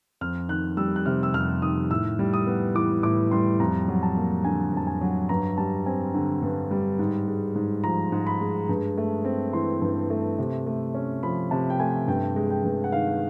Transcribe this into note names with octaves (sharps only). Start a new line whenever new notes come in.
F2 F6
D#3 F#6
G3 E6
F#6
C3 F6
E6
F2 F6
D#3 D#6
A2 E6
G3
D#6
B3
E3 D6
A2 D6
G3 C6
F2 A#5
F#3
A5
A#3
D3 G#5
F2 A5
G#5
F#3
G2 A#5
G3 A5
C4 G#5
D3
G2
G3
G#2
G#3
G#2
F3 A#5
G#2
B5
G#3
G2
A3
C4
E3 C6
G2
A3
C3
A3
C#4
F3 B5
C3 A5
G5
A3 G#5
G2 G5
G#3
G5
G2
F#5
D#3 F5